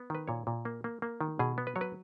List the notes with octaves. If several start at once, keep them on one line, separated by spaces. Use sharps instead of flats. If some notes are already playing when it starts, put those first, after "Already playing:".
Already playing: B3
D#3 B4
A#2 C#5
A#2
A#3
A#3
A#3
D#3
B2 G#4
B3
B4
F#3 C#5
B4